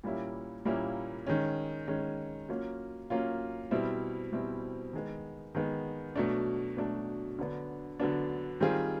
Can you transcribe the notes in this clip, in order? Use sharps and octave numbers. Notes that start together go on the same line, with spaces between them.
A#2 G3 A#3 C#4 E4
A#2 G3 A#3 C#4 E4
D#3 G#3 C#4
D#3 G#3 C#4
F#3 A#3 C#4 F4
F#3 A#3 C#4 F4
B2 G3 C4 E4
B2 G3 C4 E4
D#3 G#3 B3
D#3 G#3 B3
B2 F#3 A3 D4
B2 F#3 A3 D4
D3 F#3 B3 D4
D3 F#3 B3 D4
D#3 G3 C4 F4 G#4